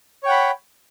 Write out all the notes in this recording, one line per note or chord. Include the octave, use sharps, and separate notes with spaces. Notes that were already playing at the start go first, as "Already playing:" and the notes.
C#5 F#5 G5 B5